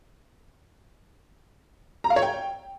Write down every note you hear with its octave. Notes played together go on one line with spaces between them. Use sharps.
A#5
F5
C#5
G5